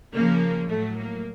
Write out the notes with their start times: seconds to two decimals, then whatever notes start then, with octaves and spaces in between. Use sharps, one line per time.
0.13 C#3 F3 A#3
0.70 A2 F#3 A3
0.98 A#3